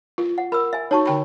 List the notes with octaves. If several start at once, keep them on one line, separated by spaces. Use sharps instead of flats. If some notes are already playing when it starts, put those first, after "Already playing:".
F4
F#5
A#4 B5 E6
E5 G#5
D#4 F#4 C#5 A5 C#6
D3 G5 B5